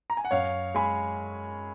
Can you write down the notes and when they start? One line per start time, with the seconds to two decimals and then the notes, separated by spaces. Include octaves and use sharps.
0.10 A#5
0.17 G#5
0.25 F#5
0.31 F#2 C#5 F5
0.75 G#3 G#5 B5